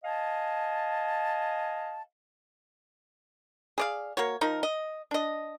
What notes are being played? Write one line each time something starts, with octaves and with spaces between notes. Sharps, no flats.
D#5 F5 G#5 A5
G#4 D5 F5
A#3 F#4 C#5
F3 D#4 A#4
D#5
D4 D#5